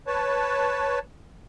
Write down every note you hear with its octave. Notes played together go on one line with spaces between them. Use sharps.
B4 C#5 A5